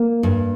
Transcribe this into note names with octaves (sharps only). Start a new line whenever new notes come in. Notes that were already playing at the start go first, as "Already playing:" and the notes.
Already playing: A#3
G2